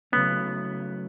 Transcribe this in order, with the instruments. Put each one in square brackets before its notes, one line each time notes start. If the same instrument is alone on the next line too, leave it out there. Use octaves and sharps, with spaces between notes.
[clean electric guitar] C#3 F#3 A3 C#4 [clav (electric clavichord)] B3